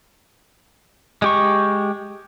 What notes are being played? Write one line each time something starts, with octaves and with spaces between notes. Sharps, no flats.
G#3 G4 C#6